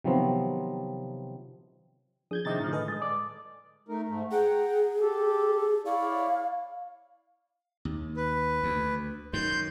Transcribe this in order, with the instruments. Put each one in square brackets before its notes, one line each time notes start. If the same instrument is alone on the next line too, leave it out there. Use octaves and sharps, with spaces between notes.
[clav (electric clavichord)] C3 D#3 F3 F#3 B3 C4
[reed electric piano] F3 D4 G#4 [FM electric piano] D#6 G6 G#6
[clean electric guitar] C3 D#3 C4 [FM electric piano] E4 D#5 A6
[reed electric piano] A2 D3 [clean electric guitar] D#3 F3
[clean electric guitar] G#4 [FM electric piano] A4 B4 D#5
[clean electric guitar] G#3 [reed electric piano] D#6 A6
[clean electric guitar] D5
[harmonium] A3 D#4 A#4
G#2 A3
[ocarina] G#4 [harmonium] F#5 G5 A#5
[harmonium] G4 A4
[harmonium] E4 C#5 D5 [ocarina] F5
[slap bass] D#2
[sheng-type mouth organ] B4
[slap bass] D2
[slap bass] F#2 D#3 [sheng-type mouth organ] C6 G6